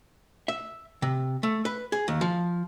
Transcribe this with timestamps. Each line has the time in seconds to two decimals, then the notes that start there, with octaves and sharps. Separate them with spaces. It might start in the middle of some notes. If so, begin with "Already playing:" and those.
0.48 E5
1.02 C3
1.43 A3
1.65 B4
1.92 G#4
2.08 D#2
2.21 F3